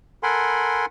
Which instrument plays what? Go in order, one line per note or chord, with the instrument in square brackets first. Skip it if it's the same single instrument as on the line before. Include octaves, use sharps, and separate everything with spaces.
[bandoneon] A4 A#4 F#5 G#5 B5 C6